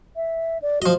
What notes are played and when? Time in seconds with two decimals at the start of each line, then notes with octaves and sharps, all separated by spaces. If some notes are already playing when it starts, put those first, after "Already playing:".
0.16 E5
0.62 D5
0.82 F3 F#4 D#5